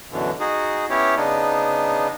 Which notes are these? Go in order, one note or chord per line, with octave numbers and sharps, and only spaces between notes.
F#2 B2 D3 E3
D#4 F#4 G#4
B3 C#4 E4 G4 C#5
C#3 B3 D4 D#4